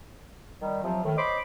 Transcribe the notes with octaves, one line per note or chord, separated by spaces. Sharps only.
D#3 G3
C3 F3 F#3
A2 D#3
C5 C#5 D#5 B5 C6 D6